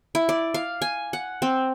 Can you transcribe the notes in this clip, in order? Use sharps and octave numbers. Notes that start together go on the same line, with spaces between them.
E4
D5
F5
G#5
F#5
C4